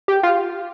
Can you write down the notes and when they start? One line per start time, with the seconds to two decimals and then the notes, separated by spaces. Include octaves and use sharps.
0.08 G4
0.23 F4